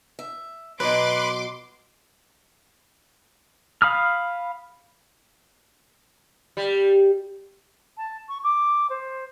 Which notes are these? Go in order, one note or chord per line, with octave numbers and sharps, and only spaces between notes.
E5
B2 F#3 B4 C6 D6
F5 B5 D#6 F6
G3
A5
C#6
D6
C5